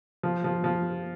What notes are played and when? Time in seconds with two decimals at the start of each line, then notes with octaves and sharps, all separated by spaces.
0.23 F3
0.44 F3
0.64 F3